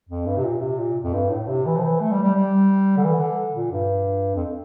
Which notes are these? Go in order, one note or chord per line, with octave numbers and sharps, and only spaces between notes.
F2
G2
C3
A#2
C3
A#2
F2
G2
A2
C3
E3
F3
E3
A3
G3
G3
G3
D3
E3
D3
A#2
G2
F2